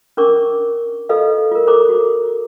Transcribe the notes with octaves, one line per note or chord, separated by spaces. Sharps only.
C#4 D4 A#4 C#6 D6
F4 A4 B4 D#5 F5
F4 A#4
A4 A#4 C5 A#5 D6
F#4